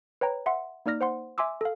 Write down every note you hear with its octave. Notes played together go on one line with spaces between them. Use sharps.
B4 C#5 G5 A#5
E5 F#5 C6
A#3 D#4 D5 F6 A#6
C5 F#5 C6
E5 G#5 C6 D6 E6
A4 F5